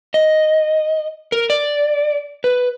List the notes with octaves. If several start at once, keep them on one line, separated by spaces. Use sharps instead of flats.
D#5
A#4
D5
B4